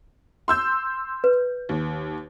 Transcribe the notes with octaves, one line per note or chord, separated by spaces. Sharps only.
C6 E6 G6
B4
D#2